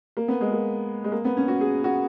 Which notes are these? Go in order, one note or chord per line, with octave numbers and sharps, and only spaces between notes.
A#3
B3
G#3
A#3
G#3
A#3
B3
C#4
F#4
G#4
F#4